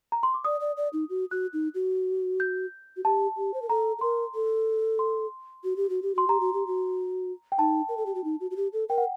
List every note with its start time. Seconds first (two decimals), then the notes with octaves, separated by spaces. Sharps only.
0.12 A#5
0.23 C6
0.34 D6
0.45 D5 D#6
0.60 D5
0.77 D5
0.93 D#4
1.10 F#4
1.31 F#4 F#6
1.53 D#4
1.75 F#4
2.40 G6
2.97 F#4
3.04 G4 A5
3.37 G4
3.54 C5
3.62 A#4
3.69 A4 A#5
3.98 A4
4.01 A#4 C6
4.35 A4
4.99 C6
5.64 F#4
5.77 G4
5.90 F#4
6.02 G4
6.15 F#4 C6
6.28 G4 A#5
6.40 F#4
6.54 G4
6.67 F#4
7.52 G5
7.59 D#4 A5
7.89 A#4
7.97 A4
8.06 G4
8.15 F#4
8.24 D#4
8.40 F#4
8.51 F#4
8.56 G4
8.73 A4
8.89 A#4 G5
8.98 F#5